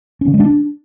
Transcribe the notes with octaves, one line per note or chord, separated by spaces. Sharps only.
C#4
D3
G#3
D4